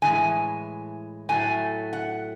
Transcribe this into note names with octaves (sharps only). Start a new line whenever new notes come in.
A2 E3 G#3 G#5
A2 F#3 A3 G#5
F#5